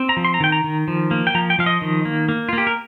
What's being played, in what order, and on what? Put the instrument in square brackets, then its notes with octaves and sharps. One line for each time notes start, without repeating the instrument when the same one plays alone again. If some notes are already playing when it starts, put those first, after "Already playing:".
Already playing: [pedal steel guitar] C4
A#5
F3
C6
A#5
D#3 G5
A#5
D#3
F3
A#3
G5
F3 A#5
G5
F3 F5
D#5
D#3
A#3
A#3
F4
A#3 G4
A#4